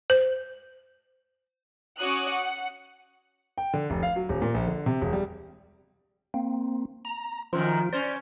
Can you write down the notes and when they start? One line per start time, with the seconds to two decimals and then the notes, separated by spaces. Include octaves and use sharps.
0.10 C5
1.98 C#4 F#4 C#5 D6 D#6 F#6
2.31 F#5
3.58 G5
3.74 D3
3.90 F1
4.03 F5
4.16 F#3
4.29 D#1
4.42 A#2
4.54 A#1
4.67 D3
4.86 C3
5.01 E1
5.13 G3
6.34 A#3 C4
7.05 A#5
7.53 F#2 D3 D#3 F3 F4
7.93 C#4 C5 D5